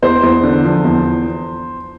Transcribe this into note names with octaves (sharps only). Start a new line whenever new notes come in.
E2 C5
E2
D3
F3
E2